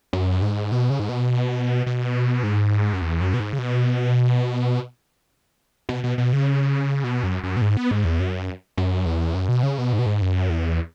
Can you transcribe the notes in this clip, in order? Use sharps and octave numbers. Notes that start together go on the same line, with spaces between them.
F#2
G#2
B2
C#3
G#2
B2
B2
G#2
F#2
E2
F#2
B2
G#2
C#3
B2
B2
B2
B2
C#3
B2
F#2
F#2
B2
G#2
B3
G#2
E2
F#2
F#2
E2
F#2
B2
C#3
B2
G#2
B2
G#2
F#2
E2